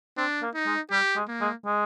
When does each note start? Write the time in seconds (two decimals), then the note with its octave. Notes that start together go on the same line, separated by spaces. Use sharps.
0.17 C4 D4
0.42 A#3
0.54 D#4
0.66 G#3
0.91 G3 G4
1.16 G#3
1.28 A#3
1.41 G#3
1.65 G#3